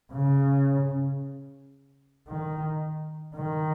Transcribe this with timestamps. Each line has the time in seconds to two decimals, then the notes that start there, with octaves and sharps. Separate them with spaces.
0.12 C#3
2.28 D#3
3.35 D#3